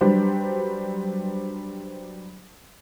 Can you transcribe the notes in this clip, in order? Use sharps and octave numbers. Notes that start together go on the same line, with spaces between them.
F#3 G3 D4 G4 B4 C5